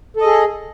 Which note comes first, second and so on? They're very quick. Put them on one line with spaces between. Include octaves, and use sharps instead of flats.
A4 D#5 G#4